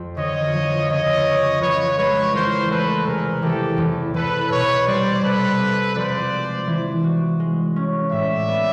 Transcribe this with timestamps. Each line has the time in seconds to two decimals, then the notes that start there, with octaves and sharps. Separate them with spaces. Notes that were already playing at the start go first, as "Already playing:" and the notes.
Already playing: F2
0.17 D3 C#5 D#5
0.53 F3
0.89 C#3 C#5 D#5
1.26 C#4
1.61 F3 B4 C#5
1.97 G#3 B4 C#5
2.34 E2 A#4 C5
2.70 A3 A4 B4
3.06 C3 G#4 A#4
3.42 E3 G4 A4
3.78 E2
4.14 E2 A4 B4
4.50 B2 B4 C#5
4.87 G3 C5 D5
5.23 C3 A4 B4
5.59 C4
5.95 F3 C5 D5
6.31 G#3
6.67 E3
7.04 F#4
7.40 G#3
7.76 C#4
8.12 A2 D5 E5
8.48 B3